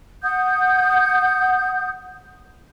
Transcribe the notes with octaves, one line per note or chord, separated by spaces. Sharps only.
F#5 D#6 G6